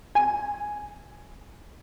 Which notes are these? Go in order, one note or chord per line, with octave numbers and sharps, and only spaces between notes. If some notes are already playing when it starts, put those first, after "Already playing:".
G#5